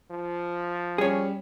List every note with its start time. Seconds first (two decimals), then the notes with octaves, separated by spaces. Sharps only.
0.11 F3
0.98 G3 C#4 G#4 C#5